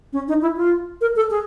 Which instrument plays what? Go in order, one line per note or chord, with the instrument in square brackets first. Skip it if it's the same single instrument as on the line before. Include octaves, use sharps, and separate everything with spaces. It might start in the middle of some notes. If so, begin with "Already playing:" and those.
[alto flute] C#4
D#4
E4
F4
A#4
A4
G#4